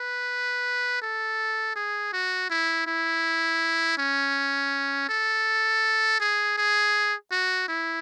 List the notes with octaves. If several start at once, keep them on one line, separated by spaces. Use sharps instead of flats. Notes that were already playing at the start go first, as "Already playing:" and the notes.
Already playing: B4
A4
G#4
F#4
E4
E4
C#4
A4
G#4
G#4
F#4
E4